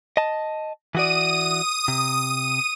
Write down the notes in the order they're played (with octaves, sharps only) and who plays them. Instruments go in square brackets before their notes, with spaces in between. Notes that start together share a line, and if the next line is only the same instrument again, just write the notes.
[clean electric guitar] D#5 A5
[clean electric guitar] E3 F#4 D5 [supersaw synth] D#6 D#7
[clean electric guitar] C3